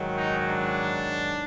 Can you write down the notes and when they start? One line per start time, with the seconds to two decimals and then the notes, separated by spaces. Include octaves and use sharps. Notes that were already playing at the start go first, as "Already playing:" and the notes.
Already playing: G#2 D#3 F#3
0.17 D#4
0.46 D4